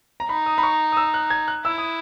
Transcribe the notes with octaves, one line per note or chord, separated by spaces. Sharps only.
A#5
D#4 B5
D#6
B5
C#6
D#6
E6
F#6
G#6
F#6
E4 E6
D#6